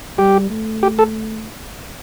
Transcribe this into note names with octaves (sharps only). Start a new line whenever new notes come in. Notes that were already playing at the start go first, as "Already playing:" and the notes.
G3 G4
A3
G4
A4